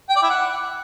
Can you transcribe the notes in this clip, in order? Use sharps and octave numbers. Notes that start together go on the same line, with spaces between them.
G5
D5
E4
F#5